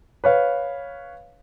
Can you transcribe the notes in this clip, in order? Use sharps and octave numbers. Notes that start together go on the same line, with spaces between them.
B4 C#5 F5